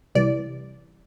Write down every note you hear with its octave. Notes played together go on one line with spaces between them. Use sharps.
C2 C3 E3 G3 D5